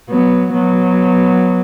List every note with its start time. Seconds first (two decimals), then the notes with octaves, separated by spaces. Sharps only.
0.09 F#3 B3
0.53 F#3 B3